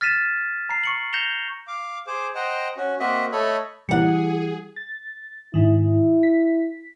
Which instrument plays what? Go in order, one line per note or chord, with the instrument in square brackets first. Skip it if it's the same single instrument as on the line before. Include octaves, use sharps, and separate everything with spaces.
[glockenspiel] F6 A6 B6 D#7 E7
A#5 C7
C#6 C#7 F#7
G6 A#6 C#7 E7 F7 G7
[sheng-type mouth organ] F5 D6
G#4 C5 D6
C5 D#5 F#5 G5 A#5
C#4 F#4
A#3 C4 F#4 D#5 E5 F#5
A3 A4 C#5 D#5 B5
[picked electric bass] E3 G3 [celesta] E4 C#7 [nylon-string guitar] G4 F#5 [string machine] G#4
[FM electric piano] A6
[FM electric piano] G#2 D#3 [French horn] E4
[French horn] E4
[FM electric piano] B6